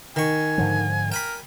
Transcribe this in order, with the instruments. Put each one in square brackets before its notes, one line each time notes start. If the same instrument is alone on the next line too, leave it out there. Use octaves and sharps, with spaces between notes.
[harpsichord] D#3 C#6 [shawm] G#5
[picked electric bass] G#2 D3 F3
[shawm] A#4 [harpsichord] G5 G#5 B5